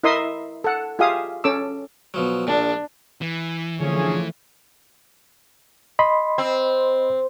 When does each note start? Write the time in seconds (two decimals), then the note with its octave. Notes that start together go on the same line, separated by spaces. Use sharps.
0.04 E4 A#4 D#5 E5 C6 D#6
0.64 A4 F#5
0.99 F4 G4 G#4 E5 F5 D#6
1.44 C#4 A4 D6 E6
2.14 B2 F3 F#3
2.47 A#1 A#2 D4
3.21 E3
3.80 D3 F3 A3 C#4 G#4 C#5
5.99 D#5 B5 C6
6.38 C4